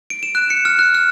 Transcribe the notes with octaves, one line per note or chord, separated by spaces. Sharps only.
D7
E7
F#6
C#7
F6
F#6
F6